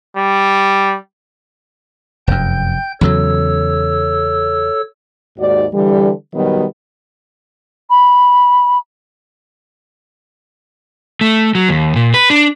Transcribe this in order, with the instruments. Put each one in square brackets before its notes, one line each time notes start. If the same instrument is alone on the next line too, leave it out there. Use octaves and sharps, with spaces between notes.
[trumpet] G3
[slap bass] F1 F#2 [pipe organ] G5 G6
[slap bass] E2 C#3 F#3 [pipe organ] A4 C#5 E6
[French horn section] D#2 G#2 F#4 D5
D3 E3 G3
B2 D#3 F#3 G3 B3
[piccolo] B5
[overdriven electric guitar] A3
F#3
D#2
A#2
B4
D4